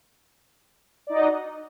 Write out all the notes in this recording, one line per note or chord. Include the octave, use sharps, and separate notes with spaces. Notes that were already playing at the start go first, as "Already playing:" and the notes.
D#4 F#4 D5 D#5